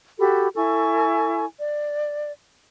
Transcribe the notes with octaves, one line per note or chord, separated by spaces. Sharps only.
F#4 G4 A4 B5
E4 A4 G#5 C#6
D5